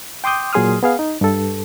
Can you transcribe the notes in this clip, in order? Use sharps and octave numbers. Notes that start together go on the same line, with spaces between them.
G5 C6 D6 D#6 G6
A#2 F#3 G#4 C6 D#6 F6
B3 G#4 F5
D#4
G2 A4